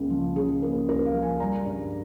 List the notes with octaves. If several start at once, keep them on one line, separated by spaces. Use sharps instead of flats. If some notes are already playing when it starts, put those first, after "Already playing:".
Already playing: C#2 C#3 A#3
F3
C#3 G#4
A#3 A#4
C#2 A#4
F5
F3
G#5
G3 A#5
G2